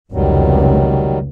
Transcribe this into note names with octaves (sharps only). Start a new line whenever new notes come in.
F1 C#2 D#3 F#3 G3